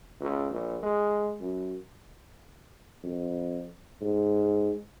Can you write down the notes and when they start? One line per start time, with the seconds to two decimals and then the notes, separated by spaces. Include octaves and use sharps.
0.21 C#2
0.51 A#1
0.83 G#3
1.40 F#2
3.03 F2
4.01 G#2